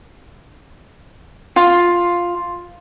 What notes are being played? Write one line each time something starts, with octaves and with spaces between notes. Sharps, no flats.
F4